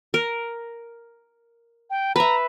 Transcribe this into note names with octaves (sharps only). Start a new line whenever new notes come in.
A#4
G5
B4 E5 A#5